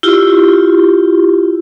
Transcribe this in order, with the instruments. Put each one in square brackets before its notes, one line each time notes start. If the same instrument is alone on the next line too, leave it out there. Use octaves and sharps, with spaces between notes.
[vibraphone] E4 F4 G4